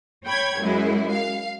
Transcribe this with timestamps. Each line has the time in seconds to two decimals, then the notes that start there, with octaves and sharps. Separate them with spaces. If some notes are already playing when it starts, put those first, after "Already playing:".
0.25 C#5 G5 B5 G#6
0.61 F#2 G#3 E4
1.12 F5